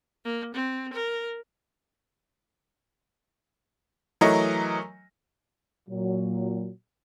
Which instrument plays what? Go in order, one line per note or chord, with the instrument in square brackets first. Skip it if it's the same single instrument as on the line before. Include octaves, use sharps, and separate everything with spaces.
[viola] A#3
C4
A#4
[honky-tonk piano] E3 F#3 A3 A#4 C#5 D#5
[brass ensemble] A#2 F#3